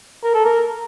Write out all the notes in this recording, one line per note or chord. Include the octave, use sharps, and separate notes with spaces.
A#4
A4
A#4